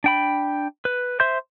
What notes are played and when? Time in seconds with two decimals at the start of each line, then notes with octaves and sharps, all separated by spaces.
0.04 D4 G5 B5
0.85 B4
1.20 C5 E5 C6 G6